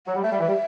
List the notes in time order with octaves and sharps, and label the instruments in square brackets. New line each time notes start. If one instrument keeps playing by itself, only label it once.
[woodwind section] F#3 [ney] F#5
[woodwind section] G3
[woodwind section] A3 [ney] E5
[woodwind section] G3
E3
G3